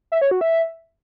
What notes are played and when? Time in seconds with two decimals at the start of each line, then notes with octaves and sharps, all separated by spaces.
0.12 E5
0.21 C#5
0.31 F#4
0.41 E5